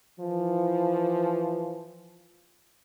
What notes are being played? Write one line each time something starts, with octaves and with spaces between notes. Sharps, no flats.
E3 F3